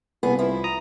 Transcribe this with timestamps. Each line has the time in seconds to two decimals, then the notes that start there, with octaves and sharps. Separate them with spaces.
0.23 C2 G2 B3 G#4
0.39 F3 E4
0.64 A#5 D#6